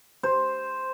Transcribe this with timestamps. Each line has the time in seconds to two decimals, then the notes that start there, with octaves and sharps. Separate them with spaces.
0.23 C5